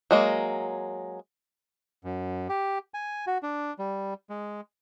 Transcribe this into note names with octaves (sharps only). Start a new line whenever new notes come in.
F#3 G#3 A#3
F#2
G4
G#5
F#4
D4
G3
G#3